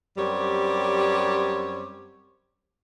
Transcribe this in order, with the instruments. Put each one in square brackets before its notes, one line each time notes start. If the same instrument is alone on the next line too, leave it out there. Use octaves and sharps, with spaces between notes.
[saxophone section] F#2 G3 C4 G4 C#5